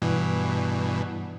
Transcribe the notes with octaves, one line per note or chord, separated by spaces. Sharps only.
G2 B2 E3